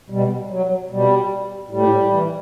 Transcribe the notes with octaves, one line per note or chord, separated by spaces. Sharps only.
B2 G3
F#3
B2 G3
A2 G3
E3